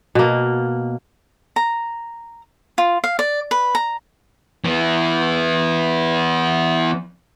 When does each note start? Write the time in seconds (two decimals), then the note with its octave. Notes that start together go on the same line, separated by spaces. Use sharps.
0.15 B2 A#3
1.56 A#5
2.78 F4
3.04 F5
3.19 D5
3.51 B4
3.75 A#5
4.65 E3 B3